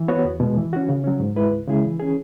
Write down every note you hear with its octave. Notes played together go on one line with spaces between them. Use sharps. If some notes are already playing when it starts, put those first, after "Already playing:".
Already playing: E3
B3 F#4 C#5
E2
B2 G#3
E3
C#4 F#4
C#3
F#3 C#4
G#2
G#3 E4 B4
C#2
C#3 G#3 E4 G#4
E3
C#4 G#4